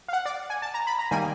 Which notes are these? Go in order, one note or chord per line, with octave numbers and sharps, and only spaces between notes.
F5
F#5
D5
G#5
A5
A#5
B5
A#5
D#3 G3 A#3 G#5